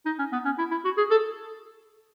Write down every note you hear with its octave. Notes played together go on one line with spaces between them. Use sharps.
D#4
C#4
B3
C#4
E4
E4
F#4
G#4
A4